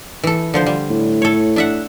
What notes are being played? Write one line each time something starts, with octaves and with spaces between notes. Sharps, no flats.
E3 A4
D3 F3 C5
G3
A2
A4 C#5
D4 E5 F#5